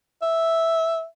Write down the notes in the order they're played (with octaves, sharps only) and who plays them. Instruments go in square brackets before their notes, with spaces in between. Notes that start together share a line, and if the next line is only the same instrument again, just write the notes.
[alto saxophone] E5